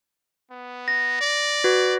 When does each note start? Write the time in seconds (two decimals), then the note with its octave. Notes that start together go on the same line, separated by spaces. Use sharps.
0.51 B3
0.88 A#6
1.21 D5
1.64 F#4 B4